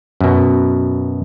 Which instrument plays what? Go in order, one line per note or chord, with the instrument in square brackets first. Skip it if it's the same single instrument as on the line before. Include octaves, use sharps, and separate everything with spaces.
[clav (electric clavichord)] F#2 B2